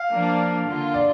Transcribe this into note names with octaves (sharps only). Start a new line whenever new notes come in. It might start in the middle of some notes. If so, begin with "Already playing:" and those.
Already playing: F5
F3 A#3 D4
D3 A#3 F4
D5